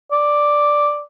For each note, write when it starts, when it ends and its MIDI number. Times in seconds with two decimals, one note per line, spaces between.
0.12 1.02 74